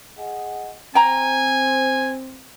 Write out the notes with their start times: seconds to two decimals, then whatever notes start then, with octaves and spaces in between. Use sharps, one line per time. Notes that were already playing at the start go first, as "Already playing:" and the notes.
0.18 G#4 D#5 F#5
0.95 C4 G5 G#5 A#5